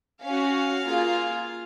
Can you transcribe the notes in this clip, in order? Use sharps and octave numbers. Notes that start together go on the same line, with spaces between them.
C#4 F#4 F5
A#3 F4 G#4